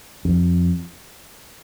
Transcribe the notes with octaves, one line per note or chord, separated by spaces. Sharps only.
F2